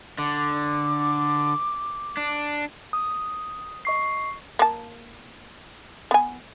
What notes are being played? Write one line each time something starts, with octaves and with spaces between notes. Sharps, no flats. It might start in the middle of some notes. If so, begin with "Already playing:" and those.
D3 D6
D4
D#6
D#5 C#6 C7
A#3 A5
B3 G#5